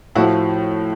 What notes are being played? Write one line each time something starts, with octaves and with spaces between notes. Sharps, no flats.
A2 F3 E4 F#4